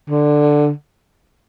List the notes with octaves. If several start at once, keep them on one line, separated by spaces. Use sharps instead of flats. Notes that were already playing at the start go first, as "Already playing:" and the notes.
D3